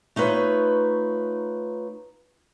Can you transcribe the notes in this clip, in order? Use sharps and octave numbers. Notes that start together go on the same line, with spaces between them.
A3 D#4 F4 B4 C#5